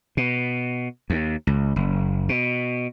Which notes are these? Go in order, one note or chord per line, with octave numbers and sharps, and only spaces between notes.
B2
D#2
C#2
F#1
B2